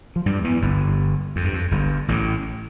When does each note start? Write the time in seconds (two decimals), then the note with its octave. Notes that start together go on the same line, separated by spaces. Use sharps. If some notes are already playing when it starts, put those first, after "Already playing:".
0.16 F3
0.26 G2 G3
0.44 E2 E3
0.62 G1 G2
1.36 F2
1.44 G2
1.53 F2
1.71 G1 G2
2.08 A1 A2